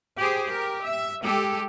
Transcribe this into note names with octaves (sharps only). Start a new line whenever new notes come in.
G4 G#4 C5
G4 A#4
E5
G#3 G4 A4